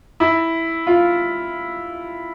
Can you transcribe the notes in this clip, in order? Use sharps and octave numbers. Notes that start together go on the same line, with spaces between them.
E4
F4